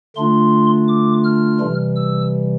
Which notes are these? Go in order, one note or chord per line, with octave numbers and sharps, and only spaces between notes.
D3 A3 D4 F4 C6
D6
F6
C3 E3 G3
E6